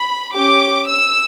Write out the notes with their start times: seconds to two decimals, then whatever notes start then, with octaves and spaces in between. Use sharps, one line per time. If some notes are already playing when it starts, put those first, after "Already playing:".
Already playing: B5
0.35 C#4 G4 D6
0.89 E6